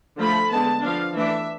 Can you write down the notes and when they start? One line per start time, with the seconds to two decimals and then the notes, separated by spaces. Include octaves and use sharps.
0.17 D3 F3 A3 B5
0.49 D3 G#3 B3 A5
0.81 F3 B3 D4 F5
1.14 E3 A3 D4 E5